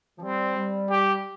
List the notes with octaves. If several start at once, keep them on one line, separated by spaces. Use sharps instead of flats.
F3
G3 C4
G3
G4